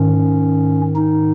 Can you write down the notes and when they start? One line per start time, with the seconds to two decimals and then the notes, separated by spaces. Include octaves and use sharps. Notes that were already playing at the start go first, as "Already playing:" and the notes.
Already playing: G#2 D#3 C#4
0.96 D#4